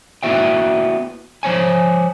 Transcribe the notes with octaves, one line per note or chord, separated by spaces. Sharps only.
A#3 B3 E4 F#4 E5 G5
F3 C5 C#5 G#5